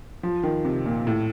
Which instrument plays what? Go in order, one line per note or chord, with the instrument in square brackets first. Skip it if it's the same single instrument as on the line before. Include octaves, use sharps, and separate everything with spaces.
[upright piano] F3
D#3
C3
A#2
A2